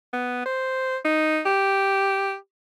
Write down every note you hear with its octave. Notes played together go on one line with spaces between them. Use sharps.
B3
C5
D#4
G4